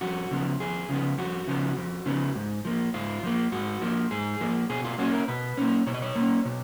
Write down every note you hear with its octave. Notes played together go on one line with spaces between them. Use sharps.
F2 F#4
C#3 F3 B3
F2 G#4
C#3 F3 B3
F2 F#4
C#3 F3 B3
F2
C#3 F3 B3
G#2
F3 A#3
G#2 F4
F3 A#3
G#2 F#4
F3 A#3
G#2 G#4
F3 A#3
B2 G#4
F4
A#3 C#4 F#4
A#4
B2 B4
A#3 C#4
B2 C#5
D#5
C#5
A#3 C#4
B2